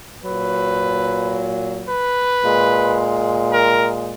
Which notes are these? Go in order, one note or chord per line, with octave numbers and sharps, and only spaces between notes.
A#2 F#3 B4
B4
A#2 G#3
A#4